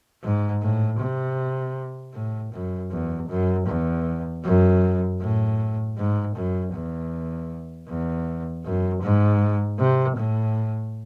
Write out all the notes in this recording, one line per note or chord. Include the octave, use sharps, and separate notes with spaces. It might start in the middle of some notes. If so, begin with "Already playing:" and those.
G#2
A2
C3
A2
F#2
E2
F#2
E2
F#2
A2
G#2
F#2
E2
E2
F#2
G#2
C3
A2